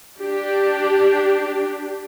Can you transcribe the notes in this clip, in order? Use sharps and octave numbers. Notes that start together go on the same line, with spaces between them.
D4 G4